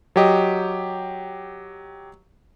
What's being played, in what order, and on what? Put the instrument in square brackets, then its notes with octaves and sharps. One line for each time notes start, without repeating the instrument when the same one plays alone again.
[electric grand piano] F#3 G4 D#5